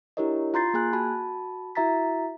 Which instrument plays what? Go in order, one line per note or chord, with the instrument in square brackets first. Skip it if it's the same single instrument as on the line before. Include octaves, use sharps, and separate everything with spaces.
[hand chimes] D4 E4 G4 A#4 C#5 D#5
F4 A#5 C6 G6 A6 C7
A#3 G#4 G#5 F#6
F#4 A5 B5
E4 F#4 E5 A#5 A6 B6